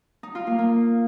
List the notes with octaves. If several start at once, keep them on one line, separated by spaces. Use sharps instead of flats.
D#4
F4
A#3
A#3